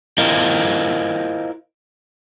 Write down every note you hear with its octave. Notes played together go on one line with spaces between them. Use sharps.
E4 F4 A#4 C5 D#5 F5